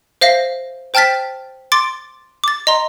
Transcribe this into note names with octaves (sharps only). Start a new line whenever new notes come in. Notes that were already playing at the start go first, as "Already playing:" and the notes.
C5 E5 F5 A#6
C5 G5 A5 F6 A6 B6
C6 D6 A6 D7
D6 A6
D#5 A#5 C6